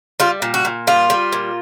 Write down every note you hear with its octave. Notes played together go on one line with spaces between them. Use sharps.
G3 F4
A#2
F#4
A#2
G3 F4
G3
A#2